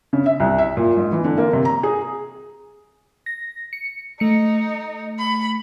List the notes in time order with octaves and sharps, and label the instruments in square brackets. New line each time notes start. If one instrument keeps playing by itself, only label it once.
[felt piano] C#3
E5
C2
E5
A#2
G#2
E3
D3
A#3
C3
A#5
G#4
[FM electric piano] A#6
C#7
[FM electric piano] A3 C#7 [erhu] D#4
[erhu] B5